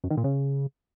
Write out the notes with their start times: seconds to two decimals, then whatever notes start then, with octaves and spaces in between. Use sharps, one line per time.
0.04 F#2
0.11 D#3
0.17 A#2
0.24 C#3